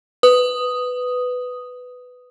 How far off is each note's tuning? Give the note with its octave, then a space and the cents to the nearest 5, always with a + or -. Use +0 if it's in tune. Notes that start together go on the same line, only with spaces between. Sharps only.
B4 +10 D#6 +0